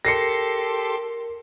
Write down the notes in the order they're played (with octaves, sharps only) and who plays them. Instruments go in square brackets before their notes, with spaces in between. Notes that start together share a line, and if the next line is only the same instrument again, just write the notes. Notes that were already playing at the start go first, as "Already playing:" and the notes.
[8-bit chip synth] G4 A4 C6 [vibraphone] A#4 [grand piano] A#6 C7 C#7